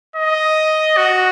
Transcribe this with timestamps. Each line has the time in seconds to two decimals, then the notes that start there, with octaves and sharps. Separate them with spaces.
0.16 D#5
0.97 F#4